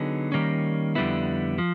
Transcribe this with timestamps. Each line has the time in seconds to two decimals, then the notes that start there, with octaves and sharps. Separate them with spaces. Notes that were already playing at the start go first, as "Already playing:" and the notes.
Already playing: D3 F#3 B3 D#4 G#4
0.32 D#3 G3 A#3 C#4
0.95 F2 D3 G3 B3 E4
1.58 F3